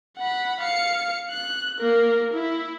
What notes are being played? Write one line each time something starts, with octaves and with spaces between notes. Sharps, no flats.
F#5 B5
F5 C#7
F#6
A#3 A#4
E4